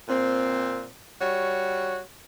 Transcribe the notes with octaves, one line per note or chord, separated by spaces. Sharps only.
A#2 C4
G3 F#4 C#5